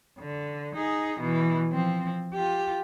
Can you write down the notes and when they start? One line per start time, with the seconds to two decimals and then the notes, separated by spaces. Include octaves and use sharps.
0.19 D3
0.75 D#4 G#4
1.20 B2 E3
1.72 F3 C4
2.33 F4 G4